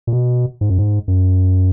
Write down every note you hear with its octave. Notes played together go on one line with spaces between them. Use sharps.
A#2
B2
G#2
F#2
G#2
F#2